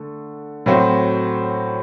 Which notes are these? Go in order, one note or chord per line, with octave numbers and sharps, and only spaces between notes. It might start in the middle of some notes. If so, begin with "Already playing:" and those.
Already playing: D3 A3
A2 F#3 C4 F#4